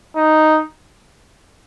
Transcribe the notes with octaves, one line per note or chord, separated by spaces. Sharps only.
D#4